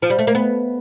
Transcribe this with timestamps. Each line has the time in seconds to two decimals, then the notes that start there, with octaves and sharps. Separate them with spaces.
0.02 F3
0.10 G3
0.19 A3
0.27 A#3
0.35 B3